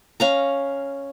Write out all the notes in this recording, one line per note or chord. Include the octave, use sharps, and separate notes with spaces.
C#4 F5 A#5